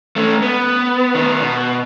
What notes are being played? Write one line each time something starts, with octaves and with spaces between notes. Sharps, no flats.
A3 C#4
B3
D#3 B3
B2